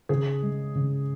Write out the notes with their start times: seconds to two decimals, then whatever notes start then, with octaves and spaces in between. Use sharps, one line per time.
0.09 C#3 G#4
0.43 G#3
0.75 C#3